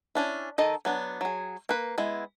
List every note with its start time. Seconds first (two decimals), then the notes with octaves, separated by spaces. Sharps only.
0.15 C#4 D4 E4
0.58 D#3 A4 D#5
0.85 F#3 B3 D4
1.21 F#3 G#4
1.69 A#3 B4
1.98 G#3 B3 E4